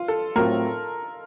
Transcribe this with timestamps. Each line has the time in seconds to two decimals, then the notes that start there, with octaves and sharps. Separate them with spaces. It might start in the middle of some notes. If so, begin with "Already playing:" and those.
Already playing: F4
0.08 A4
0.36 A2 F#3 C4 F4 A#4